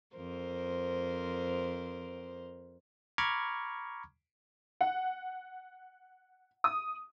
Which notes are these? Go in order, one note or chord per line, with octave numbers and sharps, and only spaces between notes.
F2 A#4 C5
A#5 B5 C#6 D6 F6 G#6
F#5
D#6